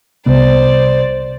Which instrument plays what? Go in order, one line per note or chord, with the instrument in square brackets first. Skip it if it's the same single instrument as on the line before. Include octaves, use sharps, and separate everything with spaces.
[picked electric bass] C2 C3 B3 [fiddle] C5 D5